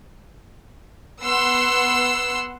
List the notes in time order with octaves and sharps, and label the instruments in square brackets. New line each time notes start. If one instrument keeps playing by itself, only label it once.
[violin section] B3 F#5 C6 E6